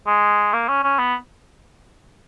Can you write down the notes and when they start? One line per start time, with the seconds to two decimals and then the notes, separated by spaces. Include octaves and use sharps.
0.07 G#3
0.53 A#3
0.68 C#4
0.83 C#4
0.99 B3